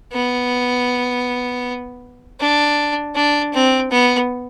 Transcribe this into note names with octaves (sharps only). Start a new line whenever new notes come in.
B3
D4
D4
C4
B3